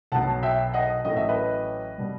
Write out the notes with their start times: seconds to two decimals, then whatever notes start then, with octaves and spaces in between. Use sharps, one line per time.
0.12 B1 B2 F#3 F#5 A5
0.43 E5 G5
0.74 D#5 F#5
1.05 A1 A2 F#3 D#5
1.16 E5
1.29 B4 D#5
1.98 B2 G3